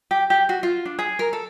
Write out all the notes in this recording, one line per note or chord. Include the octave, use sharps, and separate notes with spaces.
G4
G4
F#4
F4
D4
G#4
A#4
A4